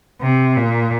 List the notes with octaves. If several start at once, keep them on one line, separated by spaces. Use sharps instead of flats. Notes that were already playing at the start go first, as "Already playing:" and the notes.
C3
A#2